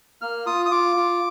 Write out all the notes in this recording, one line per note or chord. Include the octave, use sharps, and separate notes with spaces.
A#3 F6
F4 D#6
D#6
F4 D6
F4